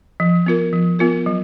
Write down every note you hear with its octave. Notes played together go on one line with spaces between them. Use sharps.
F3
B3 F4 A#4
F3
B3 F4 A#4
F#3